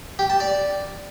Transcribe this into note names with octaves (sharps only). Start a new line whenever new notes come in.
G4
A5
D5